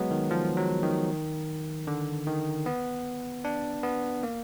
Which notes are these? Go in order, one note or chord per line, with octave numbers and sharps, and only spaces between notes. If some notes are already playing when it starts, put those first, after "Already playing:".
Already playing: F#3 G#3 B3
D#3
F3
F#3
D#3
D3
D#3
B3
D4
B3
A#3